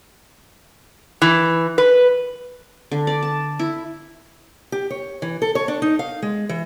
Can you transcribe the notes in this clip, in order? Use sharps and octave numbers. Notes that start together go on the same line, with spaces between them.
E3
B4
D3
D5
A5
E4
G4
C#5
E3
A4
C#5
D4
D#4
F5
G#3
E3